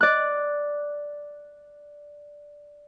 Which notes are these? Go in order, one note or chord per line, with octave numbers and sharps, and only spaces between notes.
D5 F#6